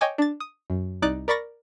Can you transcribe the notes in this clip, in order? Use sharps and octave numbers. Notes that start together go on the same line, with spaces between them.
C#5 D#5 G5 G#5 D6
D4 A6
D#6
F#2
C2 D#4 D5 D6 F#6
A#4 D5 B5 C#6 A6 A#6